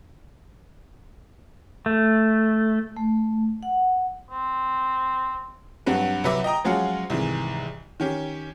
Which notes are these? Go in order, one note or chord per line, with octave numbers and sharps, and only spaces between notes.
A3
A3
F#5
C4
G2 F#3 C4 F#4 B4
C2 F#3 B4 E5 D6
D#5 G5 A#5 D#6
F3 F#3 G#3 C#4 F4 F#4
C2 G#2 D#3 E3
D#3 C#4 G4